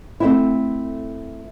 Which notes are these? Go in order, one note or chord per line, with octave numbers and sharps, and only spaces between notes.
A3 C4 E4